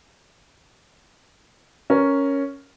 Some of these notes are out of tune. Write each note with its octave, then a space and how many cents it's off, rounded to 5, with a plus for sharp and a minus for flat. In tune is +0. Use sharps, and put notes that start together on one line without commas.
C#4 +0 A#4 +0